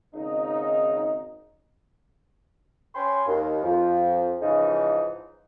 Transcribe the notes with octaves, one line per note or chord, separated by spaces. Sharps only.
G#1 C#3 D#4
C#4 G5 G#5 B5 C6
D#2
F2 F3
G#2 C#3 E3 F3 D#4